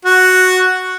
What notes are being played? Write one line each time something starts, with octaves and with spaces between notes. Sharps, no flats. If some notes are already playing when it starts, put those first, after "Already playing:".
F#4